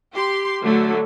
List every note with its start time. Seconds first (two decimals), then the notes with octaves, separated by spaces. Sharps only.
0.14 G4 C6
0.62 D3 F#3 A3